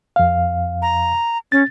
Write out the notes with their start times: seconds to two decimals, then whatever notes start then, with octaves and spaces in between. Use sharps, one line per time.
0.16 F2 F5
0.82 A#5
1.52 C#4 A6